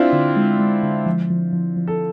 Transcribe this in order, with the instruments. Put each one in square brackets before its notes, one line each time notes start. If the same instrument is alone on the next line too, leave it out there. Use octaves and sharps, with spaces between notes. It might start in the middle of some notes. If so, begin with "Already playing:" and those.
Already playing: [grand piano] C4 D4 E4 F4
[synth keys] D3
G#3
G#3
D3
F3
F3
F3
F3
[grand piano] A4